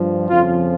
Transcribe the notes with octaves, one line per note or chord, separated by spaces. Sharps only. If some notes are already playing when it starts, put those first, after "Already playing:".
Already playing: G2 F3
F2 C#3 F3 F4